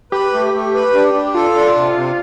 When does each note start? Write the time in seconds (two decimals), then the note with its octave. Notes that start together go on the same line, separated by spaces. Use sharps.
0.12 G4 B4
0.33 A3
0.54 A3
0.74 B4
0.94 D4
1.14 D4
1.34 F4 A4
1.55 D4
1.75 C3
1.96 C3